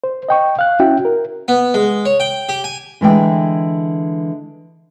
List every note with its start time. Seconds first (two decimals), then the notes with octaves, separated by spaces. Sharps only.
0.04 C5
0.29 D#5 G5 C#6
0.59 F5 F#6
0.80 C#4 E4 F#4 E5 G5
1.05 A#4
1.48 B3
1.74 G#3
2.05 C#5
2.20 G5
2.49 G4
2.64 G#5
3.01 D3 E3 G#3 G5